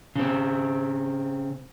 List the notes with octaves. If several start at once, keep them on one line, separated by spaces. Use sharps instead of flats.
C#3 C4